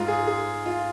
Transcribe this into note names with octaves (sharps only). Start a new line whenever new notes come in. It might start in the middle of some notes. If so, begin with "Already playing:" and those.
Already playing: G#2 G#3 F4
G#4
G#4
F4